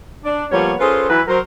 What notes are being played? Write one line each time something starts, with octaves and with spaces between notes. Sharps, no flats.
D4
F3 G3 A#3 B3 C#5
C#4 F4 G#4 A4 B4 C5
E3 F#3 E4 B4
F#3 A#4 C5